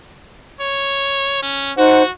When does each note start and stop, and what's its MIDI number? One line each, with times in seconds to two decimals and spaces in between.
0.61 1.43 73
1.43 1.72 61
1.78 2.02 63
1.78 2.11 66
1.78 2.02 72
1.78 2.02 78